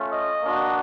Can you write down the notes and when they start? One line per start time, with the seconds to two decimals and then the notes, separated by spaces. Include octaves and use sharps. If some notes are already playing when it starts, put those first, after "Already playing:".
Already playing: A3 C#4 F4
0.12 D#5
0.43 A#3 D4 F#4